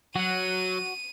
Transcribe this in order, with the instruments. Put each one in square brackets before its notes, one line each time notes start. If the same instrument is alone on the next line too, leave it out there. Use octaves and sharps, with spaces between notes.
[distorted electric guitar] F#3 [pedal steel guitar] F#4 F#5 [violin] D#7